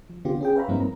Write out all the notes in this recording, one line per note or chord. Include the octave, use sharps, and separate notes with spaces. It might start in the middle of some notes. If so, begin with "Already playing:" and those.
F3
D3 B3 F4 G4
C#4 G#4 G5
B4 C#5 E5 F5 A#5 B5
G2 F3 A#3 C4 D#4
A#5